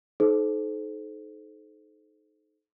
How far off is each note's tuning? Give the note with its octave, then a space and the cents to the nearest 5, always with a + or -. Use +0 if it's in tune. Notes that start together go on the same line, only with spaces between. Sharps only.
D#4 +0 A4 -40 C5 -10